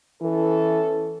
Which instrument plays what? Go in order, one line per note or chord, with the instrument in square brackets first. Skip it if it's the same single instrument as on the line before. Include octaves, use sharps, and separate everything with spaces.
[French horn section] E2 C#4 A4 [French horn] E3